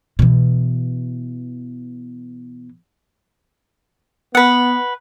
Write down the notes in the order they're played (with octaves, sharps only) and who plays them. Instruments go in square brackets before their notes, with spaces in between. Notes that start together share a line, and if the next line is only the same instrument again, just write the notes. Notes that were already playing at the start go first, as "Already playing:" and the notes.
[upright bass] B2 E3
[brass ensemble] B3 [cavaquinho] B4 F#5